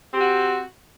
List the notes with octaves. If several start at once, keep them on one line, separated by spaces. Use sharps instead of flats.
C4 F#4 G4